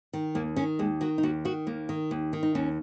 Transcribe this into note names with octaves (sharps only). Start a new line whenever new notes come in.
D#3
D#2 A#3
D#3 C#4
D#2 G#3
D#3 F#4
D#4
D#2 F#4
D#3 F#4
D#2 A#3
D#3
D#2
D#3
D#4
D#2 C#4